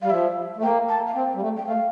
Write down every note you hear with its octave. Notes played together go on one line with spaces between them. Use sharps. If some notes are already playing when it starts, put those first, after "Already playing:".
G3 F5
F3 E5
A3
A#3 G5
A5
F5
C4 G5
G3
A3
G5
A3 F5